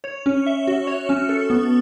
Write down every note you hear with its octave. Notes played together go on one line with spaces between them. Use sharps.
C#5
C#4
E5
F#4
C#5
C#4
A4
B3